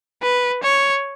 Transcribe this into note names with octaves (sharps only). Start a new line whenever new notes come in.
B4
C#5